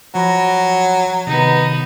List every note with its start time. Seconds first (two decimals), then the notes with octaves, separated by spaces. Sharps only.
0.15 F3 F#3 B5 A#6
1.27 C3 D#3 B3 D#4